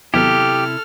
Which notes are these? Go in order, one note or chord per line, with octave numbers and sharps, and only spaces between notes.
D#2 C3 F#3 B3 E4 G4 A4 F6